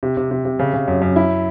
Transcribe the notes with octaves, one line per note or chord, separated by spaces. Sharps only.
C3
C3
C3
C3
C#3
C#3
F#2
F#2
E4